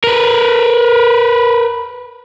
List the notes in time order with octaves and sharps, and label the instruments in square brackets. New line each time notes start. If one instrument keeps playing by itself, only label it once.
[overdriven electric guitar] A#4 B4